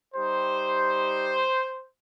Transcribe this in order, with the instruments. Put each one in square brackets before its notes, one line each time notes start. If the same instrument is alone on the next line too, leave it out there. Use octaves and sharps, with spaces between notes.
[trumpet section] G3 D#4 G4 C5